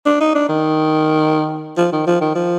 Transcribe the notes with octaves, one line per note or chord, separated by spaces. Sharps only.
D4
D#4
D4
D#3
F3
D#3
F3
D#3
F3